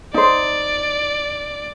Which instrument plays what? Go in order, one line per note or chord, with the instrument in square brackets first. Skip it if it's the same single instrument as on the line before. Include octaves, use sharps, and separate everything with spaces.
[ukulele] D#4 C5 [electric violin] D5